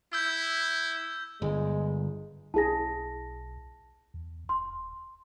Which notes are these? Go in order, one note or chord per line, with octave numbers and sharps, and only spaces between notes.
E4 E6 G6
G1 G#3
B1 E4 G#4 A5 A#6
E2
D#1 C6